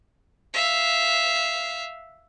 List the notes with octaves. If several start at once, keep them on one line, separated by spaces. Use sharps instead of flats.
E5 F5